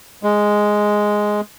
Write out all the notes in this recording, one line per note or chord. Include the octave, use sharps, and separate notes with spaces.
G#3